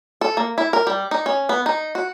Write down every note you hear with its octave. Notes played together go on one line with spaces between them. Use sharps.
A4
A#3
E4
A#4
G3
D#4
C#4
B3
D#4
F#4